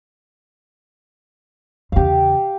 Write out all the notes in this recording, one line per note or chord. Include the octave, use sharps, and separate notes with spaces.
E2 C#3 G4 F5